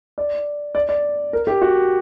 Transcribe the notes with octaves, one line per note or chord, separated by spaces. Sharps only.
D5
D5
D5
A#4
G4
F#4